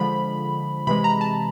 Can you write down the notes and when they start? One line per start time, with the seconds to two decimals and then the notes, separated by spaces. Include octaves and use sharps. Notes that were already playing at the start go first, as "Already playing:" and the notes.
Already playing: D3 F3 G#3 B5
0.87 C3 E3 G#3 B5
1.04 A#5
1.21 A5